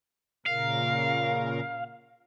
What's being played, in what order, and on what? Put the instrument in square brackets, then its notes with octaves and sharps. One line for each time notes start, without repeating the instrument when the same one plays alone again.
[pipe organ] A#2 C#3 A#4 [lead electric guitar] F5